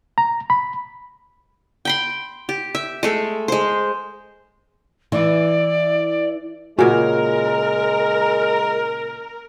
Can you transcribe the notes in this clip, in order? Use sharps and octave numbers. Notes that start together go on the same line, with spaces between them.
A#5
B5
G5 B5 C6
G4
E5
G#3 A3 A4
G#3 C5
E3 D5
A#2 C#3 G#3 F#4 A#4 G#5